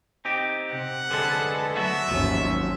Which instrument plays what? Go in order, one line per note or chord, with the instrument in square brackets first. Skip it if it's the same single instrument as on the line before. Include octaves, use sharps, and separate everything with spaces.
[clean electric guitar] C4 D#4 G4
[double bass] C3 [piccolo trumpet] F#5
[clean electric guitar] D3 G#3 [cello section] G#4 A4 B4
[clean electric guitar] D2 B3 F#4 [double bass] F#3 [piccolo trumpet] E5
[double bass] G#1 C#4 [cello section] D#2 F#3 [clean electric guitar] F3